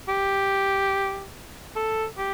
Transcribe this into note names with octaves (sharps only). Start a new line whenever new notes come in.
G4
A4
G4